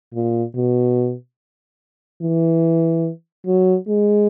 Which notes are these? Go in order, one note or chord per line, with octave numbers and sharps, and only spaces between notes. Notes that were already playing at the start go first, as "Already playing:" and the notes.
A#2
B2
E3
F#3
G#3